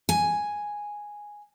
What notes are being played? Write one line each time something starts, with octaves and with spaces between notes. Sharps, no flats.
G#5